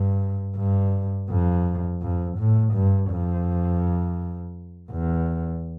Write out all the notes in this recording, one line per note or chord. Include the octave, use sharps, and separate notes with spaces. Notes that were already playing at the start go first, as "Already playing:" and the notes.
Already playing: G2
G2
F2
F2
A2
G2
F2
E2